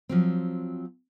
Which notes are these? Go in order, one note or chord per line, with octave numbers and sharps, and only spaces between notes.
F3 F#3 C4